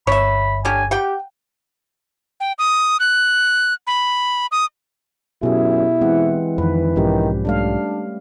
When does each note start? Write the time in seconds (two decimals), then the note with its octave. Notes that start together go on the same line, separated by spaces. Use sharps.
0.07 G1 C#5 E5 B5
0.65 D3 C#4 G4 G#5
0.91 G4 F#5 G5
2.40 G5
2.59 D#6
3.00 F#6
3.87 B5
4.52 D#6
5.43 F#2 B2 E4 G4 G#4
6.01 E3 G#3 C4 F#5
6.58 F2 D#3 B4
6.96 B1 G#2 D#3 F3 C#4 G4
7.45 G3 A3 D4 F5